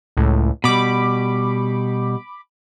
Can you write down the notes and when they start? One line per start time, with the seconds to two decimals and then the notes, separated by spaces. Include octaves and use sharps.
0.17 C#2 A2
0.64 B2 G3 B5 D6